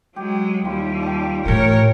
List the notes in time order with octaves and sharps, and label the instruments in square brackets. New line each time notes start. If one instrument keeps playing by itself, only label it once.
[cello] F#3 G#3 [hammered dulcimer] G4
[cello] D#2 G3 [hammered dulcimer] E4 F4 G4
[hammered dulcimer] G5 A5
[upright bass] A2 E3 [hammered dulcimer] C#3 [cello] A#4 C#5